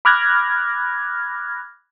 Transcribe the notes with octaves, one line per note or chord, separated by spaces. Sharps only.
B5 D6 F6 F#6 G#6 A#6